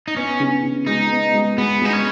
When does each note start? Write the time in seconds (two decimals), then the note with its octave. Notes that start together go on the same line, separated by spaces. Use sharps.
0.08 D#4
0.16 B3 C#4
0.40 C#3
0.63 C#3
0.86 G#3 D#4
1.10 B3
1.34 G#3
1.58 G#3 B3
1.81 G#3 D#4
1.93 C#4